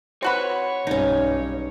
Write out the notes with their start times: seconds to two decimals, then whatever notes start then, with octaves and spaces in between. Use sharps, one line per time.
0.23 C4 F#4 B4 C#5
0.87 B1 G2 C#4 D#4